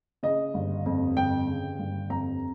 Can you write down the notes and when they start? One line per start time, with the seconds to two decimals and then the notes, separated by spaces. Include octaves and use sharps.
0.23 C#3 D#5
0.54 G1
0.86 F2
1.17 G1 G5
1.48 C#3
1.79 G1
2.10 F2 A#5